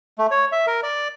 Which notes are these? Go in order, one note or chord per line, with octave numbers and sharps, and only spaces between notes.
A3
C#5
E5
A#4
D5